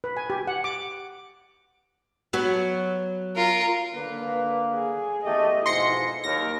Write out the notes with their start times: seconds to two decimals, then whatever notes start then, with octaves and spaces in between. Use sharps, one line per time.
0.04 B4
0.17 G#5
0.30 G4
0.47 F#5
0.64 D6
2.33 F#3 B3
3.36 F4 A#4
3.95 D3 A#3 B4
4.73 G#4
5.25 E2 A3 G4 D#5
5.66 F2 G#2 B2 E4 C6 A#6 C#7
6.24 D#2 A#4 A#6